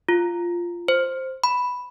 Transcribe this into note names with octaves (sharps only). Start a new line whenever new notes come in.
F4
C5
B5